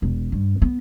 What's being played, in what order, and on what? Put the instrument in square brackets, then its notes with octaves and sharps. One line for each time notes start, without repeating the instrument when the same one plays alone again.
[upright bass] E1
G2
B3